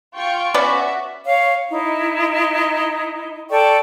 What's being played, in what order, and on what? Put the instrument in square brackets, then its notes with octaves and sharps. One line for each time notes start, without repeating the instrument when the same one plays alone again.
[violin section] F4 G5 C#6
[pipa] B3 C#4 D5 [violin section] F#4 E5
[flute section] C#5 F5
D#4 E4
A4 D5 G5 C#6